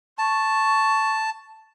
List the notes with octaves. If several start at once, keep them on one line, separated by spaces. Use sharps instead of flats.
A5 C#6